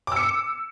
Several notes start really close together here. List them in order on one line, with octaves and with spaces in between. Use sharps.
D6 E6 C#7